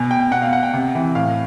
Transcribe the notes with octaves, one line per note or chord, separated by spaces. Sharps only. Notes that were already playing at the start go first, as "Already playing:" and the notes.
Already playing: B2 G#5
G5
B2 F#5
F5
F#5
G5
C3
E3
A2 F5